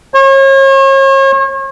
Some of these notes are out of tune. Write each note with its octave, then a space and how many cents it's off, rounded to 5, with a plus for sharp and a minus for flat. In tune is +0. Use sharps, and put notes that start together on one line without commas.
C#5 -40